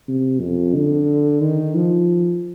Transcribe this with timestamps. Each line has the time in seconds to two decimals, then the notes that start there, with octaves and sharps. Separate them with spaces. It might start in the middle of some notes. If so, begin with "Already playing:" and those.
0.08 C3
0.41 F2
0.75 D3
1.41 D#3
1.75 F3